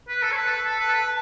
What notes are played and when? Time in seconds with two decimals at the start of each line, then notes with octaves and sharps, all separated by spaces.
0.08 B4
0.22 A4
0.31 C#5
0.36 B4 A5
0.47 A4
0.50 B4
0.65 A4
0.79 B4
0.88 A4
0.94 B4